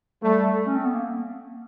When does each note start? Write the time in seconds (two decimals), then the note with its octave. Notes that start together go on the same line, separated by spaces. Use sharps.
0.23 G3 A3
0.66 C#4
0.75 C4
0.85 B3
0.95 A#3